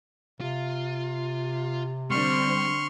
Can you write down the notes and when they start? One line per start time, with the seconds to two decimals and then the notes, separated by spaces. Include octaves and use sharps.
0.41 C3 F4
2.11 D3 G3 C4 C6 C#6 F6